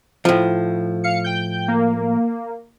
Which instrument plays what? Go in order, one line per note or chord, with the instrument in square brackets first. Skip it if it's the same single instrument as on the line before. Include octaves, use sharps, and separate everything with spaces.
[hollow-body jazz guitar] A2 F3
[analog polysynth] F5 C#7
G5 G6
A#3